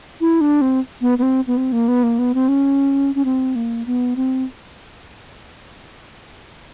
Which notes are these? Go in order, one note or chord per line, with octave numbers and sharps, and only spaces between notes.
E4
D4
C4
B3
B3
C4
B3
C4
A#3
B3
A#3
B3
C4
C#4
C#4
C4
A#3
B3
C4